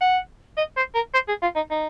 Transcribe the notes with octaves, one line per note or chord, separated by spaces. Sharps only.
F#5
D#5
C5
A#4
C5
G#4
F4
D#4
D#4